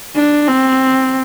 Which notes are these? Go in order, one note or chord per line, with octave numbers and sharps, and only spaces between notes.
D4
C4